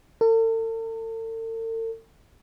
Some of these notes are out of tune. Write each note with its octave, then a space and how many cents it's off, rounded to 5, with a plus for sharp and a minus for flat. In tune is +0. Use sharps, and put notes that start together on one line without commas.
A4 +45